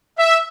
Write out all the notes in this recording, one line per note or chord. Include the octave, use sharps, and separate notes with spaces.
E5